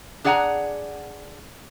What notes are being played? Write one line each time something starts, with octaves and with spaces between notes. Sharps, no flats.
D4 G#4 D5 F#5 A5 A#5